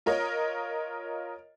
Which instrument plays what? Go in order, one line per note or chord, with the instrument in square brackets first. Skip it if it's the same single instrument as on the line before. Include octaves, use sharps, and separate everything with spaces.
[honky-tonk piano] F4 A#4 C#5 D#5